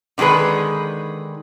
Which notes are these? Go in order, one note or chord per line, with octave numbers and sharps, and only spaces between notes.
D3 D#3 G#3 G#4 B4